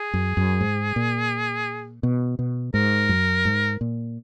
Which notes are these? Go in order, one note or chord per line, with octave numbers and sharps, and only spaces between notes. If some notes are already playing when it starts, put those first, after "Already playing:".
Already playing: G#4
F#2
F#2
G#2
A#2
B2
B2
G#2 A#4
F#2
G#2
A#2